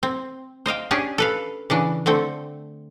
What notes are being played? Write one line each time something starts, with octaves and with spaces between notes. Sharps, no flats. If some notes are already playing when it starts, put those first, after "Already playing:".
C4
C5 D#5 F5 G5
C#4 D4 G4 G#4
A4 B4 F5
C#3 E3 D4
D3 A3 C4 A4